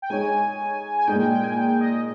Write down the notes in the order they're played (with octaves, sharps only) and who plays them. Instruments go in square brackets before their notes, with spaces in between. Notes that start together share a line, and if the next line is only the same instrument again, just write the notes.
[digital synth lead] G5
[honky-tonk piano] G#3 D#4 G#4 C#5 [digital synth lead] G#5
[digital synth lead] G#5
[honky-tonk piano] A#2 G#3 D#4 [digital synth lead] G5
[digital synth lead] G5
G5
G#5
G5
D#5